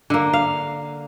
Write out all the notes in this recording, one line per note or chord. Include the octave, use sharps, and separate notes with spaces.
D3 A#3
F5